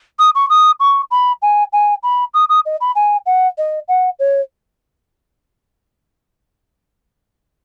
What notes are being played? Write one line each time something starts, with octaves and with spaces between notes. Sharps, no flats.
D#6
C#6
D#6
C#6
B5
G#5
G#5
B5
D#6
D#6
D#5
B5
G#5
F#5
D#5
F#5
C#5